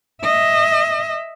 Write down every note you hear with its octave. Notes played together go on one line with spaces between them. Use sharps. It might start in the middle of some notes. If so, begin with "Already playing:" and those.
D#5 E5